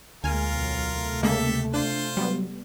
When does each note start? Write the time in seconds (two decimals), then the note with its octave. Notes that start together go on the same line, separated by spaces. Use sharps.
0.24 D2 G#3 A#3 F4 A#4 G#5 F6
0.56 B1 F#3
0.91 C3 A3
1.23 C#3 G#3 A#3 G4 A4 E5
1.74 D4 F4 C5
2.17 F#3 G3 B3